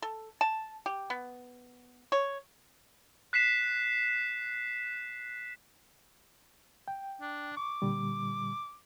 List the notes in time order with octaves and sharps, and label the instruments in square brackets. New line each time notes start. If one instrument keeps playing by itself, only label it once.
[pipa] A4
A5
G4
B3
C#5
[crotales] F#6 B6 C7 E7
[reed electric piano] G5
[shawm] D4
[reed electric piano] C#6 [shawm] D6
[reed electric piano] A#2 D3 G3